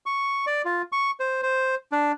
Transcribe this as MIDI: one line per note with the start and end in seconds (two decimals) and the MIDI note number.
0.06 0.45 85
0.47 0.62 74
0.65 0.82 65
0.92 1.11 85
1.20 1.41 72
1.43 1.75 72
1.92 2.12 62